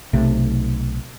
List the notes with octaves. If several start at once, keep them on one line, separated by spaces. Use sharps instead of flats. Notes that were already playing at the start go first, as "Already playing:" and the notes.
B1 C3 A3